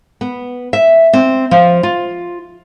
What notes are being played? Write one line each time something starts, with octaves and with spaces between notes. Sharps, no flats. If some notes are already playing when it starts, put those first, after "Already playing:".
B3
E5
C4
F3
F4